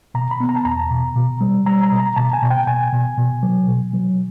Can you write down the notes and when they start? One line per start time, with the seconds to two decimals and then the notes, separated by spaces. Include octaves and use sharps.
0.14 B2 A#5
0.31 B5
0.40 B3
0.49 A#5
0.56 A5
0.65 E2 A#5
0.91 B2
1.15 B2
1.41 G3
1.66 G3 A#5
1.83 A#5
1.92 B2
2.00 A#5
2.16 B2 A5
2.33 G#5
2.42 B2
2.50 G5
2.67 B2 G#5
2.92 B2
3.18 B2
3.43 F#3
3.68 B2
3.93 F#3